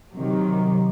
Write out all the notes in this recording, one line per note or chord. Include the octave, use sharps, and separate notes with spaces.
C3 D#3 F#3